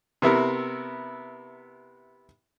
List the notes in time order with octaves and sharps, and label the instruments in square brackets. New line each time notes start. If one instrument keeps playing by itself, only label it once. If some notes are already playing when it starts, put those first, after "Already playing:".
[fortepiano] C3 B3 E4 A#4